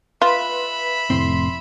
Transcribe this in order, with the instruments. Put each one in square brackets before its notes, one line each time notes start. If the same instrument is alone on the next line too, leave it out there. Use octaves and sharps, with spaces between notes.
[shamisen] F4 [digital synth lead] B4 [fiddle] E5 B5
[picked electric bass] F1 A2 C4 [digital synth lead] C6